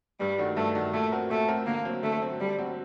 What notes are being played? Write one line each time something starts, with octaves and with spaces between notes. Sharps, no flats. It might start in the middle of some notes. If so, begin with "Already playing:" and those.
G2 G3
D#3 A3 D4 F#4
G2 A3
D#3 A3 D4 F#4
A#2 A3
A3 C4 F#4 A#4
A#2 A3
A3 C4 F#4 A#4
D3 A#3
F#3 C4
D3 A3
F#3 C4
D3 G3
F#3 C4 F#4